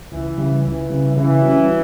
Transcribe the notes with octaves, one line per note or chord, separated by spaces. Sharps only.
C#2 E3
C#3 G3
C#2 E3
C#3 G3
C#3 E3
G3 C#4 F#4